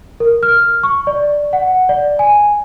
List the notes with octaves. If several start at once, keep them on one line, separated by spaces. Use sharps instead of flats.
A#4
F6
C#6
D5
F#5
D5
G#5